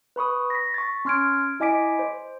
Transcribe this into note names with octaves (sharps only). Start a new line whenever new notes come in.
B4 B5 C#6 D#6
A#6 B6
C#6 A6
C#4 C6 F6 G#6 D7
E4 D#5 G#5 D6 B6 D7
C5